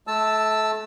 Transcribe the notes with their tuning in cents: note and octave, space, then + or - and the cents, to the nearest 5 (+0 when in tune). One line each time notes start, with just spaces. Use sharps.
A3 -30 A5 +0 E6 +0